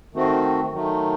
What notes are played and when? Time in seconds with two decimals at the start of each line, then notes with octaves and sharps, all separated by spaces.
0.14 D#3 A3 C4 F#4
0.72 D#3 F#3 A3